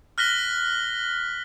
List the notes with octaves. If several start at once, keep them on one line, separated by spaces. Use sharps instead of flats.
F6 F#6 A#6 B6 G7